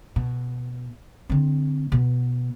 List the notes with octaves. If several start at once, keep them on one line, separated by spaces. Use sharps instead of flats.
B2
D3 C4
B2 B3